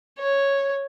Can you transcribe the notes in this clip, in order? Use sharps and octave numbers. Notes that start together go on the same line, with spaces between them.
C#5